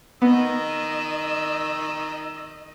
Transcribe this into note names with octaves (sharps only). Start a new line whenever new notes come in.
D#3 B3 D#5 E6